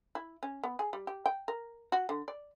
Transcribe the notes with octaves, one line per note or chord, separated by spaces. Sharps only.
E4
C#4
B3
G#4
G3
G4
G5
A#4
F#4
D3
D5